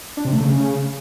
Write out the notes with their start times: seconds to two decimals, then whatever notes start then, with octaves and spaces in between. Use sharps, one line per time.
0.17 D4
0.25 C3
0.33 A3
0.41 C#3